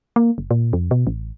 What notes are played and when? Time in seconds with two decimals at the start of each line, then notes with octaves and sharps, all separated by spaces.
0.16 A#3
0.38 F#1
0.51 A#2
0.73 F2
0.91 B2
1.07 A1